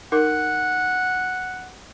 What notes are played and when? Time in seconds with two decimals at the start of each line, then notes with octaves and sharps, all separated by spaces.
0.12 D#4 A#4 F#5 D6